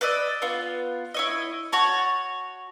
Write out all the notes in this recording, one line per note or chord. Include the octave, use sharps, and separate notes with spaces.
B4 D5 D#5 E6
B3 F4
E4 C#5 D#5
F#4 C#5 A5